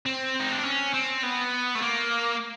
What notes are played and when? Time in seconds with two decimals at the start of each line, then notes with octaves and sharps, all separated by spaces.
0.06 C4
0.40 D#4
0.52 D4
0.65 C#4
0.94 C4
1.23 B3
1.75 A3
1.82 A#3